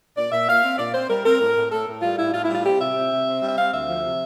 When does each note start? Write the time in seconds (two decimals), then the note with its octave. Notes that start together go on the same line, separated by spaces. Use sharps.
0.16 A#2 D5
0.31 A#2 E5
0.48 A#2 F5
0.64 C4
0.78 A#2 D5
0.93 C4 C5
1.09 G3 A#4
1.25 C4 A#4
1.40 A2
1.56 A2
1.71 A2 A4
1.87 A2
2.02 G3 F4
2.18 A2 E4
2.34 A2 F4
2.44 E4
2.49 G3 F4
2.64 C4 G4
2.80 C3 E5
2.95 C4
3.11 C3
3.26 C4
3.42 G3
3.48 E5
3.57 C4 F5
3.72 D2 E5
3.88 F3
4.04 C3